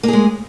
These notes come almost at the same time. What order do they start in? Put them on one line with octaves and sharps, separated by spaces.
A#3 G#4 G#3